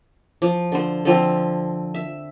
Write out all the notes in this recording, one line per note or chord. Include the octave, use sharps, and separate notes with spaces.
F3
D3 C5
D3 F3 C4
E5